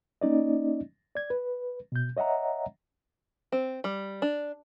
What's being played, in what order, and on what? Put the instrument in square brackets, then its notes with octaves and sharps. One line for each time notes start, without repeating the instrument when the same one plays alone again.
[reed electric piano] A#3 C#4 D#4 D5 D#5
D5 G#6
B4
B2 G6
C#5 D#5 E5 F#5 A#5
[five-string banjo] C4
G3
D4